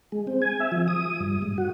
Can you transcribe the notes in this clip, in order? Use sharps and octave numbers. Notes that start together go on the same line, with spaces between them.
G#3
C4
G#5
E5
F3
D#6
G2
G#2
F#4